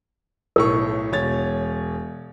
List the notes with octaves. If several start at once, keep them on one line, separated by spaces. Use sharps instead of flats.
B1 A2 A#4 C#6
E1 C#5 A6